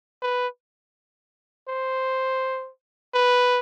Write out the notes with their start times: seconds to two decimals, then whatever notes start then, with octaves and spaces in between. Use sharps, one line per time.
0.22 B4
1.68 C5
3.14 B4